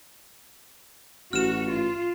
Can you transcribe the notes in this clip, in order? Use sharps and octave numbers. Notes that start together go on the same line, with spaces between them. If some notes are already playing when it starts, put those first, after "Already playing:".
A1 F#4 F6 E7
F4